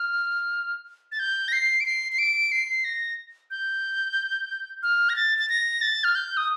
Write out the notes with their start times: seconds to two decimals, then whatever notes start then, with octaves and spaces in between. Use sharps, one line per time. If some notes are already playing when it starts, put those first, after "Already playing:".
Already playing: F6
1.12 A6
1.20 G6
1.48 A#6
1.53 C7
1.80 D7
1.86 C7
2.12 C7
2.19 D7
2.52 C7
2.84 A#6
3.51 G6
4.83 F6
5.09 A#6
5.16 A6
5.38 A6
5.49 A#6
5.82 A6
6.04 F6
6.15 G6
6.37 D#6